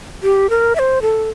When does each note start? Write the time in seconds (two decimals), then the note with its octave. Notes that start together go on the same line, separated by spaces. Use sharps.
0.23 G4
0.50 A#4
0.75 E5
0.79 C5
1.02 A4